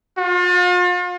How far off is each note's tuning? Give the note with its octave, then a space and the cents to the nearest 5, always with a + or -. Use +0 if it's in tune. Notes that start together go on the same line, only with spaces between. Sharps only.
F4 +40